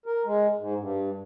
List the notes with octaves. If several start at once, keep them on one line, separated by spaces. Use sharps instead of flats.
A#4
G#3
G#2
G2